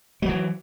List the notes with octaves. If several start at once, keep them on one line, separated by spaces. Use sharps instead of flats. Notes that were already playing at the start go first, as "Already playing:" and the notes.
E3 F#3 G3